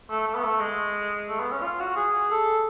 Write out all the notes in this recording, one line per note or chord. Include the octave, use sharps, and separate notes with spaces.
A3
A3
B3
A3
G#3
A3
B3
C#4
F4
F#4
G#4
A4